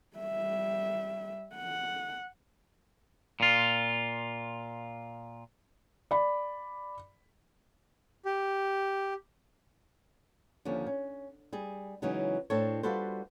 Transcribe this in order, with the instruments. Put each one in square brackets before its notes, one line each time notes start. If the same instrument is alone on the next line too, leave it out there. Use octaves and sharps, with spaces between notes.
[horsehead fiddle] G3 E5
F#5
[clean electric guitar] A#2 F4
[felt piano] D5 B5
[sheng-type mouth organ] G4
[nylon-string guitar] D#2 D3 F3 C#4
C#4
G3 G#4
C#3 E3 F#3 G#3 C#4 D#4
A2 C4 D4 A4 C#5
G3 F4 F#4 A4 B4 C5